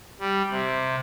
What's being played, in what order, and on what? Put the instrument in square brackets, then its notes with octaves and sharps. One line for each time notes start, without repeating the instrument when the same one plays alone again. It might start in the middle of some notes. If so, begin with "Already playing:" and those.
[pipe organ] G3
C3